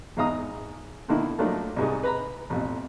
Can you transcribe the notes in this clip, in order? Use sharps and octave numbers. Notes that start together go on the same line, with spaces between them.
E2 G#2 F5 A#5 D#6
B2 D3 D#3 A#3 E4
F3 F#3 A3 A#3 D4 D#4
C2 G#2 G#4
B4 A#5 B5
A1 F2 B2